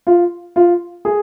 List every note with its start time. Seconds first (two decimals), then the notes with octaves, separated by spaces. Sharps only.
0.07 F4
0.56 F4
1.05 G#4